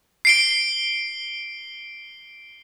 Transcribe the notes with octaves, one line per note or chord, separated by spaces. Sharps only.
C7 D7 G7